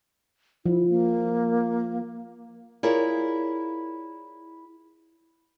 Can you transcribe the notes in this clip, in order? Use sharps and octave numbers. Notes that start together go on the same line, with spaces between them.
F3 E4
A#3
E4 F4 G#4 A#4 C#5 D5